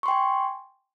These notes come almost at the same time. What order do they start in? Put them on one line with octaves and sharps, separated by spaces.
C#6 C6 G5 G#5